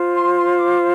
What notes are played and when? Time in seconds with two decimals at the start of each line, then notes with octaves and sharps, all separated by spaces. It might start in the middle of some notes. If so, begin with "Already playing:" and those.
Already playing: F4 C5
0.14 C6
0.36 C6
0.58 D6